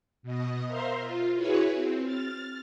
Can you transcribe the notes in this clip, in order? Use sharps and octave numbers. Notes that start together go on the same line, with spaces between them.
B2 D#5
A#4 C5 E5 F5 A#5 C6
F4
E4 F#4 G#4 B4 C#5
C4
F6 A6